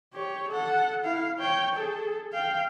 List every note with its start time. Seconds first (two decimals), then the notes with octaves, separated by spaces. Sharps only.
0.13 G4 C#5
0.48 A4 F#5
1.03 E4 F5
1.38 C#5 G5
1.75 G#4 A4
2.33 F5 G5